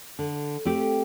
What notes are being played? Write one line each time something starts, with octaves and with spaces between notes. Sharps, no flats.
D3
A3 C4 G4